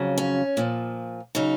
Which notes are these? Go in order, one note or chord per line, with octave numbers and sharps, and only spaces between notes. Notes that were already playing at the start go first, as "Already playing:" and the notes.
Already playing: F2 C#3 F#3
C#4
A#2 F3
C#3 F#3 D#4